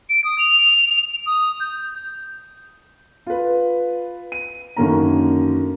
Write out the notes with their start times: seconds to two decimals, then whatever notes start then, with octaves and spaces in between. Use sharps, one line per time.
0.09 D7
0.24 D#6
0.38 F7
1.26 D#6
1.60 G6
3.27 F4 B4
4.32 D#7
4.77 F#2 D3 D#3 A#3 C#4 A#5